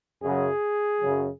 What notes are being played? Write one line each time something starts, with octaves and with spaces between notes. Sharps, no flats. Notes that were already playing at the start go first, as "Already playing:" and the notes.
F#2 C#3 F#3 G#4
F#2 C#3 F#3